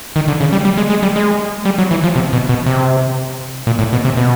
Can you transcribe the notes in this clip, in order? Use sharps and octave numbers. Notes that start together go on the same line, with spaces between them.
D#3
D3
C#3
G3
G3
G#3
G#3
G3
G#3
G3
F#3
E3
F3
C3
B2
B2
C3
A#2
A2
B2
C3
B2